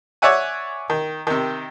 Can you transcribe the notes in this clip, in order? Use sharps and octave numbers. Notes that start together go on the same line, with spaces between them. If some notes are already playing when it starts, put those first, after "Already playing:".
C#5 D5 E5 F#5 G#5
D#3
C3 D#3